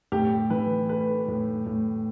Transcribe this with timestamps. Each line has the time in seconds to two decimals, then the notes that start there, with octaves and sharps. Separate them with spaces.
0.12 A2 G4
0.50 E3 B4
0.89 A3 B4
1.28 A2
1.66 A2